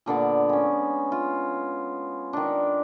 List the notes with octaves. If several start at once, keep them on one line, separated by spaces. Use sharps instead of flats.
A#2 D3 B3 D5
G#3 C#4
F4
D#3 D4